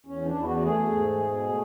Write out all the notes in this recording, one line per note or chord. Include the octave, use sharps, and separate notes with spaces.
E2 C#4
D4
E2 E4
F#4
F#4
A3 G#4
G#2
B2
A3